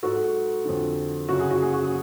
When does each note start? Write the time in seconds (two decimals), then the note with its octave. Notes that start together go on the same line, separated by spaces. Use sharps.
0.03 G#2 F#4 A4
0.65 F2 D3
1.28 F#2 C#3 F#4
1.40 G#4
1.51 F#4
1.62 G#4
1.73 F#4
1.84 G#4